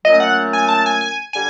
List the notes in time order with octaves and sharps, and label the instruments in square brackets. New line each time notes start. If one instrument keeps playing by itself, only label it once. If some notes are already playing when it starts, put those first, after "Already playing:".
[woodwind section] A#2 F#3 A3 C#4 [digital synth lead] D#5
[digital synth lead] F#5
G#5
A5
G#5
G#5
[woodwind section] D3 G3 [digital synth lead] G#5